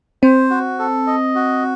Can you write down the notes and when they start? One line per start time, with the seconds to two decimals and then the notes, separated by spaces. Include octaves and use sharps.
0.23 C4 C5
0.50 F#4
0.79 A4
1.07 D#5
1.35 F#4